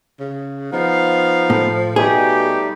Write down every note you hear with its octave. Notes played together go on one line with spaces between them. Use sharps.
C#3
F3 B3 D#4 F5
A2
B2 G3 A3 D#4 G4 G#4